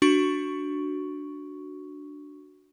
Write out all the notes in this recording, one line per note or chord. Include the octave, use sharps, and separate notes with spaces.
D4 F#4 C#6